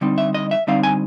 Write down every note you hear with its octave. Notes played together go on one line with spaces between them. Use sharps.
D3 G3 C4 D#4
E5
D#5
E5
D3 G3 C4 D#4 F5
G#5